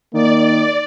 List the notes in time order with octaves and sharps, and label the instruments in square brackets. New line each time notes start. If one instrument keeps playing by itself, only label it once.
[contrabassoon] D#3 [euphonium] A#3 [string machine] D5